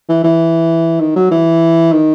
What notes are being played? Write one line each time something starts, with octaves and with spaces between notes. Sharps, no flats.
E3
E3
D#3
F#3
E3
D#3